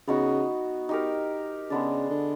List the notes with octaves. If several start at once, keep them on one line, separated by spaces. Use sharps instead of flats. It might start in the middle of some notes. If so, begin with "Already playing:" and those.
C#3 B3 D#4 F#4
D#4 G4 A#4
C#3 G#3 B3 D4
D3